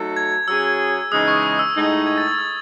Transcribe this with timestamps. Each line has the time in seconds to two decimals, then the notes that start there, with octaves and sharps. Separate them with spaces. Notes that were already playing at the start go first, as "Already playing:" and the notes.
Already playing: F#3 A3 D#4 A4
0.17 G#6
0.32 G#6
0.48 F#3 C#4 G#4 E6
1.11 C#3 E3 G#3 D#4 D#6
1.28 C#6
1.43 D#6
1.59 E6
1.75 A2 G#3 D#4
2.07 G#6
2.18 A6
2.28 G#6
2.38 E6